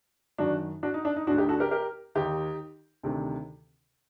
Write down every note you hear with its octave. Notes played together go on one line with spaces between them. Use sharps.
F#2 D#3 D4 F#4
D4 F#4
D#4
D4
D#4
D2 D3 D4 F#4
D#4 G4
F#4 A4
G4 A#4
G4 A#4
D#2 D#3 D#4 G4
D2 C3 D#3